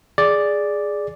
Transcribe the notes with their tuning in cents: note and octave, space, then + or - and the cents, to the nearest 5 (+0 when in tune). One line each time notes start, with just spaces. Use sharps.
G#4 +0 D5 +0